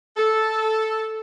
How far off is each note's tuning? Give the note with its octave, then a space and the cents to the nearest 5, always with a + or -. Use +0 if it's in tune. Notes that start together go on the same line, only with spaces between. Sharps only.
A4 -5